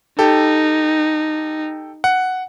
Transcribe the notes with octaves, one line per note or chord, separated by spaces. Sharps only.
D#4 G4 A4
F#5